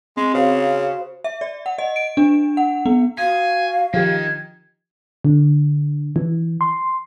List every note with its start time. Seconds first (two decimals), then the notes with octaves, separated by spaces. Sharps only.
0.17 G#3 C4
0.34 C#3 F#4 C5 F5
1.24 E5
1.41 D5
1.66 F#5
1.78 D#5
1.96 D7
2.17 D4
2.57 F#5
2.86 B3
3.18 F#4 F5 G#5 D#6
3.94 D#3 F3 G4 G#6
5.25 D3
6.16 E3
6.61 C6